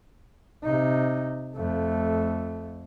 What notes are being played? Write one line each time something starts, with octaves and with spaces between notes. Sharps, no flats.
C3 D#4
F2 A3